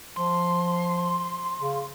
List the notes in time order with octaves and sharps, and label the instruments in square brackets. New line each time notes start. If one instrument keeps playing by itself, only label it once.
[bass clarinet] F3 [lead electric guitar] C6
[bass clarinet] C#3